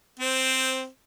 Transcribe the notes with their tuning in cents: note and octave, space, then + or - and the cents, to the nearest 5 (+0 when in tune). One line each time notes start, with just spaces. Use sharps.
C4 -5 C5 +0